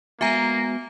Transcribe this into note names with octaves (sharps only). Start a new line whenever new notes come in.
G#3 A#3 B3 F#4 E5 G#5 A#5